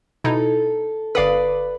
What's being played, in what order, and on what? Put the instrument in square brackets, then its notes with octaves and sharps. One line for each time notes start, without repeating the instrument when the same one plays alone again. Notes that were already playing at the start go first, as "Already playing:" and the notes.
[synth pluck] B2 D#4 E4 [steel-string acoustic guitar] A4
[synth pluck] G1 F5 D#6 [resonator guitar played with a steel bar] B4 D5